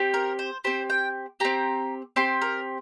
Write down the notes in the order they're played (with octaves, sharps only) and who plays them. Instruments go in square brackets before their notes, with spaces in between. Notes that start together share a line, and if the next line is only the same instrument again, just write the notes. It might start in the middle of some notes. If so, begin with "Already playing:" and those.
Already playing: [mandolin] C4 G4
A#4
C5
C4 G4 C5
G5
C4 G4 A#5
C4 G4 C6
A#4